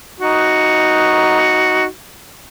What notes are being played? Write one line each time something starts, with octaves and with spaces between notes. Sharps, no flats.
D#4 F#4